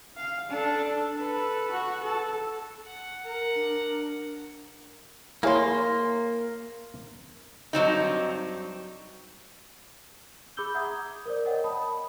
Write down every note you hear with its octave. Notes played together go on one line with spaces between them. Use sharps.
F5
D4 A4
A4 B4
F#4
A4
F#5
A#4
D4
A#3 E4 G#4 C#5 F5 C6
G2 F#3 C4 D#4
G#4 B5 D6 E6 G6 G7
E5 F#5 A#5 D#6 G6 G#6
A#4 C5 D5
A#4 C#5 D#5 F#5 G5
A5 B5 D#6